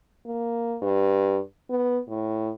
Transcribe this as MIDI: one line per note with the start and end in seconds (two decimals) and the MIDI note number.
0.26 0.77 58
0.82 1.39 43
1.69 1.99 59
2.09 2.50 45